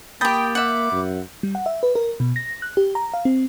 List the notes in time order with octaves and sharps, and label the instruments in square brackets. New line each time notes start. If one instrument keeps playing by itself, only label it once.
[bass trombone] A#3 [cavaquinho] G4 D#6 [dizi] G5 [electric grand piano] B5 G6 A6
[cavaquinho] E5 F#5 [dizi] D6
[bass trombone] F#2
[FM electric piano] G3
F#5
E5
B4
A#4
B2
A#6
F#6
G4
A#5
F5
C4